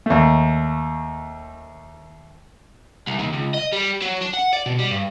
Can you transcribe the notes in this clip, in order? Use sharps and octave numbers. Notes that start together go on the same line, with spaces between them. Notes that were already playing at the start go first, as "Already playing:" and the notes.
D#2 A3
C2
D#2
C#2
D#5
G3
F#3
D4
F#5
D5
B2
G3
G2